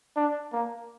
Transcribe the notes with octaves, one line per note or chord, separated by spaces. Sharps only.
D4
A#3